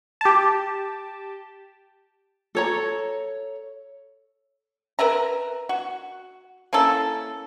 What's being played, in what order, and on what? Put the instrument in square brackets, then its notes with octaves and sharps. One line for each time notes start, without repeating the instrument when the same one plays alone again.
[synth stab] G4 A5
[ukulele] A4 C#5 A#5
[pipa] A#4 B4 E5 A#5
F#4
A#3 C#4 E4 A4